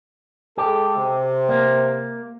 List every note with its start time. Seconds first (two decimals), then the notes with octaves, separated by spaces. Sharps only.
0.58 G#3 G4 A4
0.97 C3
1.49 A#3